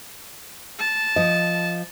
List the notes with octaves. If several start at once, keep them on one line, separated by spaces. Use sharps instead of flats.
A5
F3 D#5